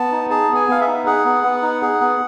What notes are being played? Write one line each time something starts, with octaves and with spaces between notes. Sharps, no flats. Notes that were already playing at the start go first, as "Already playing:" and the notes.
Already playing: B3 A5
D#4
G#4 A5
B3
G#5
B3 F5
E5
D#4
G#4 F#5
B3
B3
D#4
G#4
B3